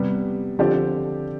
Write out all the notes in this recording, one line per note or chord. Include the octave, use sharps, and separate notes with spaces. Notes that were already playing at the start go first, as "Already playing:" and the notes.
Already playing: C3 G3 B3
D3 F3 C4 G4 D5